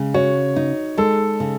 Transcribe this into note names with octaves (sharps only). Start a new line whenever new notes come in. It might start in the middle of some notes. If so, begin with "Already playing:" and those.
Already playing: C#3 G#3
F#4 C#5
D#4
G#3 A4
C#3